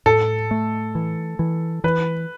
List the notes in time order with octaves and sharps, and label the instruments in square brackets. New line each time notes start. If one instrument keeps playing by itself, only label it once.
[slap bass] A2 [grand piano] A4
[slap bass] A3
E3
E3
[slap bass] E3 [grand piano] B4